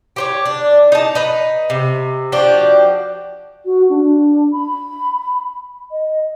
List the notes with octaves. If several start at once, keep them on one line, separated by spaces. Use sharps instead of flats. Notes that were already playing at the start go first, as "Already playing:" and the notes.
G4 C5 C#5
D4
D#4 A5
D#4 B4
C3
F3 D4 F#4 G4
F#4
D4
B5
D#5